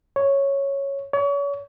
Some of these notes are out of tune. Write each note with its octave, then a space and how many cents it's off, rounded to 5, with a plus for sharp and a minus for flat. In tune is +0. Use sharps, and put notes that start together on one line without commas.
C#5 -5
C#5 +35